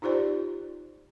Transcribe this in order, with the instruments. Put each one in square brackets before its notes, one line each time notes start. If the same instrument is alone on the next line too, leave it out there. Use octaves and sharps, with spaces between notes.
[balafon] D#4 F4 G4 C5 D5